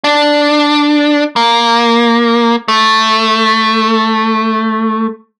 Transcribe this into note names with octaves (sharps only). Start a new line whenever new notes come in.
D4
A#3
A3